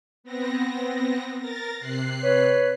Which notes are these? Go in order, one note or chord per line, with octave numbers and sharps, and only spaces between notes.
B3 C4 A#6
A#4 A6 A#6
C3 F#6 C7
B4 C#5